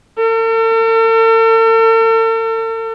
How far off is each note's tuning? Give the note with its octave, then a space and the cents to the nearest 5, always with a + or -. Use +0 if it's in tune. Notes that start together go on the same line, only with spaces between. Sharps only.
A4 +45